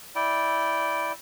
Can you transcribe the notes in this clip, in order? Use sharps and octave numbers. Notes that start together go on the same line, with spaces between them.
E4 D5 G5